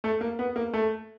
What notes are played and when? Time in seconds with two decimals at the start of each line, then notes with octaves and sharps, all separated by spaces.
0.04 A3
0.21 A#3
0.39 B3
0.56 A#3
0.73 A3